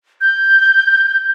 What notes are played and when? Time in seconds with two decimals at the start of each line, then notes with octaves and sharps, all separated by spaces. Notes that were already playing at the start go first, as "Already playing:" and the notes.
0.21 G6